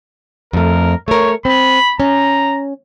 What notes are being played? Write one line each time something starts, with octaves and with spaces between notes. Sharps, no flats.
F2 A3 A#4
A3 A#4 C#5
C4 B5
C#4 A#5